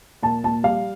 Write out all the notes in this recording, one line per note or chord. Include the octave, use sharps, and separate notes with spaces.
A#2 A5
A#2 A5
G3 F5